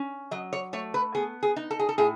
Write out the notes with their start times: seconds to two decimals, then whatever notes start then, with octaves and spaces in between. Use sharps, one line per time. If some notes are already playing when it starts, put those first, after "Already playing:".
Already playing: C#4
0.31 F#3 D#5
0.53 C#5
0.73 A3 C#5
0.94 B4
1.15 B3 G#4
1.43 G#4
1.56 D#4
1.71 A4
1.79 G#4
1.89 A4
1.98 A2 G#4